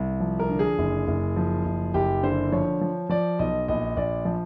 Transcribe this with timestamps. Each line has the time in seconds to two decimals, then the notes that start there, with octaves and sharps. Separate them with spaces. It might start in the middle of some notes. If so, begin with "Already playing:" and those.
Already playing: C2
0.20 F3
0.39 A#4
0.49 D3
0.59 G#4
0.78 F#1
1.08 F#1
1.36 F3
1.65 F#1
1.94 F#1 G4
2.23 D3 C5
2.52 F3 C#5
2.81 F3
3.09 F3 D5
3.39 B1 D#5
3.68 A#1 D#5
3.97 A#1 D5
4.25 F3